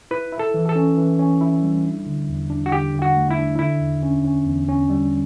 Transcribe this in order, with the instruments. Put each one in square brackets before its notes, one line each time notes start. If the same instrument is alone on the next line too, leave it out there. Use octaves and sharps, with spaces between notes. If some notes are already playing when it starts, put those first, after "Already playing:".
[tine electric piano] E4 [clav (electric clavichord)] B4
[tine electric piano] E4
[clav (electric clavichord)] A4
[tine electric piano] E3
[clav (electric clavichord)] A4
[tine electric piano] C#4
E3
C#4
E4
G3
D4
D3
E2
D4
[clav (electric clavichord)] F#4
[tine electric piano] D3 [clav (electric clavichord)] G4
[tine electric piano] D3
[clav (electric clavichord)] F#4
[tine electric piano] A3
[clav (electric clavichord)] E4
[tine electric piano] D4
[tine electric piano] D3 [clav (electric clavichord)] E4
[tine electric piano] E2
C#4
C#4
E2
C#4
G3